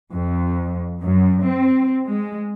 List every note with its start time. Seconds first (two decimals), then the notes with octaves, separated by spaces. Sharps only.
0.14 F2
1.01 F#2
1.45 C4
2.09 G#3